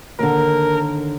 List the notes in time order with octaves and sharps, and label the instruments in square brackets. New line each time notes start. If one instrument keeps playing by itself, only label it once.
[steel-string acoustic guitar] D#2 D3 [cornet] A#4